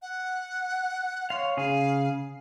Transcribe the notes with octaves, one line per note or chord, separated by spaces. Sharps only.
F#5
C#5 F5 C6
C#3 G#4 F5